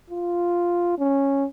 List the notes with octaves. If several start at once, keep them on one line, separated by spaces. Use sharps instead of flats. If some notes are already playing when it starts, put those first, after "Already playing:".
F4
C#4